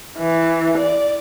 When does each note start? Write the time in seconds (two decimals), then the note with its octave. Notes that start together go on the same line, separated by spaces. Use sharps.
0.18 E3
0.78 D5